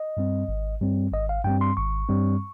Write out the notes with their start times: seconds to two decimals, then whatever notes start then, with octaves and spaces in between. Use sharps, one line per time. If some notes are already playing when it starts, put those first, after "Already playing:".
Already playing: D#5
0.17 G2 G3 C4
0.48 G#1
0.81 G2 G3 C4
1.12 G#1 D#5
1.29 F5
1.44 G2 G3 C4 G5
1.61 C6
1.77 G#1 C#6
2.09 G2 G3 C4